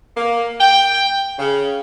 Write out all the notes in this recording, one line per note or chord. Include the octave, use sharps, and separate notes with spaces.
A#3
G5
C#3